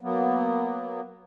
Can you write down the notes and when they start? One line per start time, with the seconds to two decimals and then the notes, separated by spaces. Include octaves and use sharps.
0.01 F#3 A#3 B3